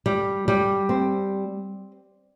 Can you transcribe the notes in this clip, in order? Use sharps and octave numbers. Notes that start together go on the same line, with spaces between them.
G3
G3
C4